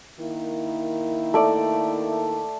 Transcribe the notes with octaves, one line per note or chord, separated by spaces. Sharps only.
D#3 A#3 E4
A3 D5